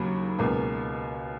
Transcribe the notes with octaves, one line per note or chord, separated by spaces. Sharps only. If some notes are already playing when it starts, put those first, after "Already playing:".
Already playing: D#2 C#3 F#3 A#3 B5
C#2 B2 A#3